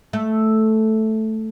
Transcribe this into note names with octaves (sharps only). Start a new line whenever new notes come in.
A3